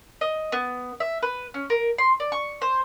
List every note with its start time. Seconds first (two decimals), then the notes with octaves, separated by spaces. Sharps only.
0.21 D#5
0.52 B3
1.00 E5
1.22 B4
1.54 C#4
1.70 A#4
1.98 C6
2.20 D5
2.32 C#6
2.62 C5